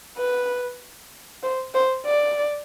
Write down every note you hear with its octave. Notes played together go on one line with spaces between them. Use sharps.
B4
C5
C5
D5